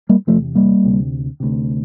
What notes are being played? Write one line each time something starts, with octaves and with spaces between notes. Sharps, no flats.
G3 A#3
E2 C3 F3 A3
G3 A#3
D2 C3
D2 C3